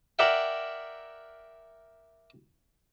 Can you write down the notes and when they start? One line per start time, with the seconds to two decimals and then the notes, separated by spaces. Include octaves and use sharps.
0.19 A#4 D5 E5 F#5 G5